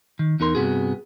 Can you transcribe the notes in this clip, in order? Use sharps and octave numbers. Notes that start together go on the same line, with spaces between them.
D#3
E2 D#4 A#4 C6
G2 C3 A#3 B3 F#4 G#4